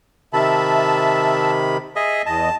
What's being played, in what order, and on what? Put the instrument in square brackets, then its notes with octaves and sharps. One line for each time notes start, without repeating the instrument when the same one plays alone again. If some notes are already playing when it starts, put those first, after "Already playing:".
[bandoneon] C3 D#3 B5 [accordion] E5 A5
[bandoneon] G#4 D#5 E5
[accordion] E2 D#5 [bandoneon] A5